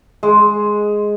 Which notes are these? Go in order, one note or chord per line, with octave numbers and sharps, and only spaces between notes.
G#3